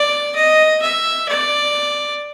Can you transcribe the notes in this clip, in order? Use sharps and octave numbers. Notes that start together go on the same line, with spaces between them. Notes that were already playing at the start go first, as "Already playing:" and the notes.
Already playing: D5
D#5
E5
D5